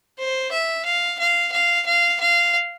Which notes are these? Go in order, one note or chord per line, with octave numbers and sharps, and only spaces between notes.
C5
E5
F5
F5
F5
F5
F5